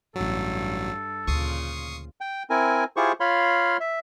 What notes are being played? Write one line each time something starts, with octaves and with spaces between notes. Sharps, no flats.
A1 G2 F#3 A4
D2 A#2 C#3 F4 C#6 D#6 C7
G5
C4 E4 A#4 G#5
E4 F4 G4 G#4 C5 C#6
F4 C#5 F5 B5 C6
E5